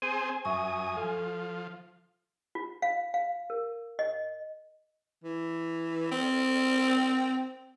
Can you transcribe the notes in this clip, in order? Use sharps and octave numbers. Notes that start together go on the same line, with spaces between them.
C4 G#4 C5 G#5
F#2 E5 C#6 D#6
F3 A4
F4
F5
F5
A#4
D#5
E3
C4